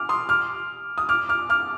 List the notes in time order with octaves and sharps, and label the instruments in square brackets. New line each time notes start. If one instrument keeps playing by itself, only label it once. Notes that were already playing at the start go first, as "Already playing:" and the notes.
Already playing: [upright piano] D6 F6
C6 D#6
D6 F6
D#6
D6 F6
D6 F6
D6 F6